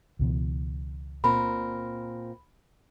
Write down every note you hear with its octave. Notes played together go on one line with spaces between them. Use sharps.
C#2 B2 E3
A#2 C4 A#4 B5